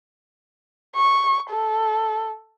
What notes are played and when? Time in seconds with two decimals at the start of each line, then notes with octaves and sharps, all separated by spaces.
0.96 C#6
1.50 A4